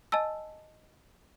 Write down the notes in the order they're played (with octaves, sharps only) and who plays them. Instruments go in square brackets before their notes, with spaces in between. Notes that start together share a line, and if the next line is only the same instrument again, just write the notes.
[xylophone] D#5 G#5 A5 E6